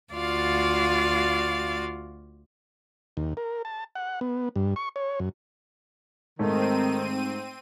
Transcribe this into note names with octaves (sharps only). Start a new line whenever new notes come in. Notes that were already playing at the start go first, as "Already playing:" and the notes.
D2 F4 F#4 D5 F5 A6
D#2
A#4
A5
F#5
B3
G2
C#6
C#5
F#2
G#2 D#3 A3 C4 D#4 D#7